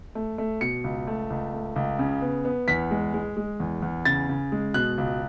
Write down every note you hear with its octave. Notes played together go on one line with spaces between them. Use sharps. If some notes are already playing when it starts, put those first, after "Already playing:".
A3
A3
B2 C#7
C#2
A3
C#2
A3
C#2
C#3
B3
B3
E2 B6
G#3
G#3
G#3
E2
E2
C#3 A6
C#3
G#3
B2 F#6
C#2